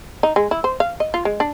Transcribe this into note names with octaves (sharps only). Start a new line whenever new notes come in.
D#4
G#3
E4
C5
F5
D#5
F4
G#3
D4